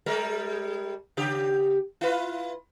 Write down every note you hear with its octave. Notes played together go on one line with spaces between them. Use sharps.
G3 G#3 A#4
C#3 G4
E4 F4 B4